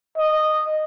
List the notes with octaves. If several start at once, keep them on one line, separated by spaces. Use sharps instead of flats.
D#5